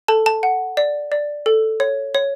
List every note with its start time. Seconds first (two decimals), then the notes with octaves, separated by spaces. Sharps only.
0.08 A4 A5
0.26 A5
0.43 F#5
0.77 D5
1.12 D5
1.46 A4
1.80 C#5
2.15 C#5